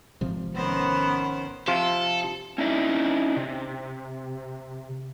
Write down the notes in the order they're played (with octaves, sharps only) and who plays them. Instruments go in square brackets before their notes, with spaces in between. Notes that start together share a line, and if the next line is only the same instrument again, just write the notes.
[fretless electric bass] G#1 C3 F3
[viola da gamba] D#3 C#4 C5 [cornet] B3
[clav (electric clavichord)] C3 F3 F4 [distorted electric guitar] A4
[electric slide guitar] C#4 D#4 E4 D5
C3